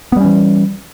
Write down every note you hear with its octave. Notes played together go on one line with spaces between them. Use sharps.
E3 G3 B3 C#4